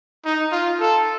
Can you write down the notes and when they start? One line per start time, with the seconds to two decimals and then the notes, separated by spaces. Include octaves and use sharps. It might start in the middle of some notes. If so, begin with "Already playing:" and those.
0.25 D#4
0.52 F4
0.80 A4